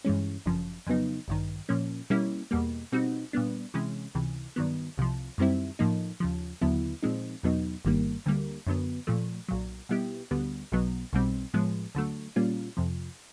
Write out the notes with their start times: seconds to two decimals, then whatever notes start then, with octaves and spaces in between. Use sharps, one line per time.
0.04 G2 E3 G#3 C#4
0.46 G1 F#2 C#3 F3
0.87 F2 C#3 F#3 B3 D#4
1.28 A1 G2 D#3
1.69 A#2 F3 A#3 C#4
2.10 B2 G3 A#3 C#4 E4
2.51 E2 B2 G3 A#3
2.92 B2 G3 C4 D#4 F#4
3.33 A#2 G3 B3 D4
3.74 C3 E3 G#3 C#4
4.15 C#2 C3 E3
4.56 G2 D#3 F#3 B3
4.98 C2 C3 F3
5.38 F#2 D#3 G3 C4 E4
5.79 A2 F3 A#3 D#4
6.20 D#2 C#3 F3
6.61 D#2 D3 F#3 B3 E4
7.03 A#2 F3 G#3 C4 D#4
7.43 E2 B2 F#3 B3 D#4
7.85 G1 G2 D#3 G3 A#3
8.26 D2 D3 G3 A#3
8.67 F#2 D3 F#3 B3
9.07 A#2 F3 A3
9.48 B1 A#2 F#3
9.89 B2 G3 B3 E4 G4
10.31 D2 D3 G3 B3
10.72 B1 B2 F#3 B3
11.13 B1 B2 G3 C4
11.54 A2 F3 G#3 B3
11.95 D2 D3 F#3 A3
12.36 A#2 G3 A#3 C#4 F4
12.77 F2 C3 F3